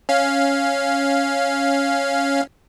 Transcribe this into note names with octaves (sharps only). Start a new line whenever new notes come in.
C#4 F5